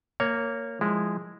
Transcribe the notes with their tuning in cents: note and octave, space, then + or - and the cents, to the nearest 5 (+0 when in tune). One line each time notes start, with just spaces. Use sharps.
A#3 -10 C#5 +5
F3 +5 G#3 -10 E4 +0